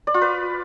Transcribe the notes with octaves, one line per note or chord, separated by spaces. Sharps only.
D5
F4
B4